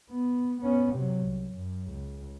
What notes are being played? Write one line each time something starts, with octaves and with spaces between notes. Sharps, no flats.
B3
B3 C#4
C3 F#3
C2
F#2
C#2